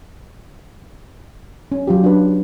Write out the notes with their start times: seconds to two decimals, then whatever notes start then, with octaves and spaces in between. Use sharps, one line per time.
1.72 C#4
1.87 F#3 F4 G4
2.04 D4 B4